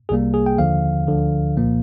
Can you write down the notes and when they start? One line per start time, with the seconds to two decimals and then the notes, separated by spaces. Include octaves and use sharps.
0.09 C2 C3 G3 A#3 G#4
0.34 G#4
0.46 G5
0.58 D#2 D3 F3 F5
1.07 D2 D3 F3
1.57 C2 A#2 F3 A#3